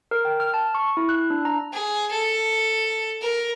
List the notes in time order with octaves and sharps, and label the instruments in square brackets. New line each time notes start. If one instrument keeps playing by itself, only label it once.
[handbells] A#4
G5
F6
A5
C#6
E4
F#6
D4
A#5
[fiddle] G#4
A4
A#4